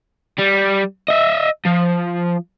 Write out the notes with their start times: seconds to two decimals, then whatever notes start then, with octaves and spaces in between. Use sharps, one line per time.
0.39 G3
1.08 D#5 E5
1.65 F3